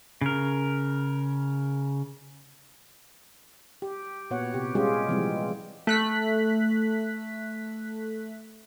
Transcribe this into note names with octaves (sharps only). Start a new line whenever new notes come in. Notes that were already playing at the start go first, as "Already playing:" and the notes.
C#3 A#4
G4
A#2 B3 F#4 C#5 F#5
C3 G4
G3 G#3 C#4 F4 G4 G#4
C3 E3 F3 G3 G#3 C4
A3 F#6 B6